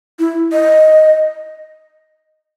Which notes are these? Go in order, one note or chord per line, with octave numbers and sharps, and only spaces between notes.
E4
D#5